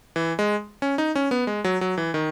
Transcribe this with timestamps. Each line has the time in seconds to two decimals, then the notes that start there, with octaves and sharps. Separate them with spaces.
0.16 E3
0.39 G#3
0.82 C#4
0.98 D#4
1.15 C#4
1.31 B3
1.47 G#3
1.64 F#3
1.81 F#3
1.98 E3
2.14 D#3